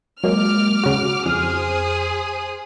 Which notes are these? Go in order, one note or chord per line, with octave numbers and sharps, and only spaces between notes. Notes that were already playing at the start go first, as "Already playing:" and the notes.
F#3 G#3 A#3 D6 F6
C#3 F#4
F2 G#4 C5 D#6 F6